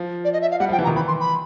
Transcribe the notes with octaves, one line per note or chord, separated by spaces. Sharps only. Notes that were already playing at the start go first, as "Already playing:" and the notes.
Already playing: F3
D5
D#5
E5
F5
G3 F#5
F3 G5
E3
A#5
D#3
E3 B5
C6
B5